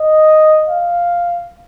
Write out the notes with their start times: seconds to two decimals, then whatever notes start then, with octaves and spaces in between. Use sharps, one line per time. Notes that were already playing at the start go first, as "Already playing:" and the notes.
Already playing: D#5
0.69 F5